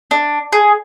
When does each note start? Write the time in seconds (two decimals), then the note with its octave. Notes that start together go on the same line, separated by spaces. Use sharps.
0.11 D4
0.52 G#4